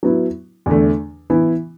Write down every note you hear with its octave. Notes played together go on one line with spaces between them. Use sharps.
F#3 B3 E4
E2 D3 A3
E3 B3 E4